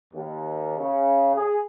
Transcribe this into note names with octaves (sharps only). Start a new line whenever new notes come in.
D#2
C#3
G#4